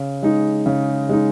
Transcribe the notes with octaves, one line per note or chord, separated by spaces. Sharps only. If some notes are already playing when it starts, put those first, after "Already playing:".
Already playing: C#3
G#3 D#4
C#3
G#3 D#4